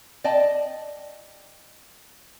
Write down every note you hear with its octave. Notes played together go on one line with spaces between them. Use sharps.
D5 D#5 G5 A5